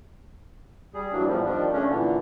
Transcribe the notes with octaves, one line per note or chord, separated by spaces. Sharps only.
G3 G#4
G2 E3 F#3 A#3 D4
E2 A2 F3 G3
D#3 F3 G3 D4
C#3 A3 C#4 D4
A#2 D3 E3